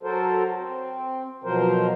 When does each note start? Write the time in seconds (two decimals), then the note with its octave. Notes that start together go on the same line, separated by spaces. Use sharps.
0.03 F#3 F#4 A4 A#4 C5
0.59 C4
1.44 B2 F3 F#3 A#4 C5